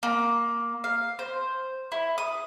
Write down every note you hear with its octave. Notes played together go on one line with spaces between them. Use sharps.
A#3
F5
C5
E4
D#6